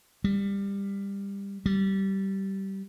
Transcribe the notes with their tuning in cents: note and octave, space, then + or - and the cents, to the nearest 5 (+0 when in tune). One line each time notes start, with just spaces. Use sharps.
G3 +20
G3 -20